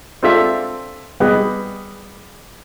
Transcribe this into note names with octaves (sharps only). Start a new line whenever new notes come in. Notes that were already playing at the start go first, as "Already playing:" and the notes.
C4 D4 F4 A4 E5 F5
G3 B3 G#4 D#5